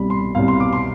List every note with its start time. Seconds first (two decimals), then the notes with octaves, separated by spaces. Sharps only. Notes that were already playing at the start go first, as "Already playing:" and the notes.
Already playing: C2 B2 G3 B5
0.10 C6
0.35 C2 B2 G3 F5
0.48 C6
0.60 D6
0.73 C6